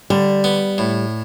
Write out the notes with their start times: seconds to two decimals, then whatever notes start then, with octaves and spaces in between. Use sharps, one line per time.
0.10 D3 G3
0.44 B3
0.78 A2